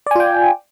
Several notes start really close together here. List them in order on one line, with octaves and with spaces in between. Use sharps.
D5 G#5 F4 G5